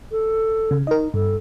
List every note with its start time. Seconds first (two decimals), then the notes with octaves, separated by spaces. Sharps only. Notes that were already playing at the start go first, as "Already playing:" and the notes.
0.11 A4
0.71 C#3
0.87 D#4 A#4 D#5
1.14 G2 A4